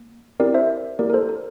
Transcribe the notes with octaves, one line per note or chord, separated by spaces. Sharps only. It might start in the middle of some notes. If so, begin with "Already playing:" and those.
Already playing: A#3
C4 E4 G4 A#4 D5
C5 E5
A#3 E4 G4 A#4 D5
A#4
A4 C5
A#4